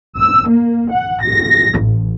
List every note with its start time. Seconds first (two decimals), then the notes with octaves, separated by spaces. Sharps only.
0.18 E6
0.49 A#3
0.93 F#5
1.23 A#6
1.80 A1